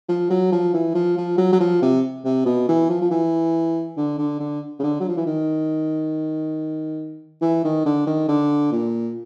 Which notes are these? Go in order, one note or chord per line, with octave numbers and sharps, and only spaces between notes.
F3
F#3
F3
E3
F3
F3
F#3
F#3
F3
C3
C3
B2
E3
F3
F3
E3
D3
D3
D3
C#3
D3
F#3
F3
E3
D#3
E3
D#3
D3
D#3
D3
A#2